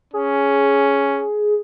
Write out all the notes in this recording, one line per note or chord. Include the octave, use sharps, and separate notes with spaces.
C#4 G#4